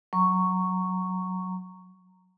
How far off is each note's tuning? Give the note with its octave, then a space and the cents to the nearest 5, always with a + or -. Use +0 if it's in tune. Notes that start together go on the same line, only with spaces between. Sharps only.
F#3 +0 A#5 -15 C#6 +0